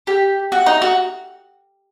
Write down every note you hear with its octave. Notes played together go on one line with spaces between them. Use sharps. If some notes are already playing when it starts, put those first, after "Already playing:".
G4
F#4
D#4
F#4